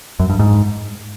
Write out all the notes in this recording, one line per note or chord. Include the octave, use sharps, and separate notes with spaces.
F#2
G2
G#2